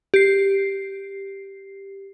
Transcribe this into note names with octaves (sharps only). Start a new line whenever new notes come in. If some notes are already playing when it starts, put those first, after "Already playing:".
G4 C7